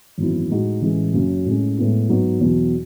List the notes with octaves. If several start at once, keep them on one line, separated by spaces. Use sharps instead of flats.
G#1 F#2 E3 B3 E4
A2 G#3 D#4 F#4
A1 A2 E3 G#3 C#4
F#1 F#2 C#3 F#3
A2 G#3 C#4
A2 G#3 B3 E4
G#2 F#3 B3 D#4 F#4
E2 B2 F#3